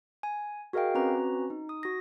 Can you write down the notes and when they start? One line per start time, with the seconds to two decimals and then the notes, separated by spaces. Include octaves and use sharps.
0.23 G#5
0.73 F#4 G#4 A#4 D#5 F5 G5
0.95 C4 C#4 F#4 B4 A#5
1.50 D#4
1.69 D#6
1.83 F#4 A#6